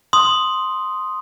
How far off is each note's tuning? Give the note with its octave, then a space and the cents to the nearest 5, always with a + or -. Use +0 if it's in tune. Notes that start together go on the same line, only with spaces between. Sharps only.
C6 +0 D#6 +0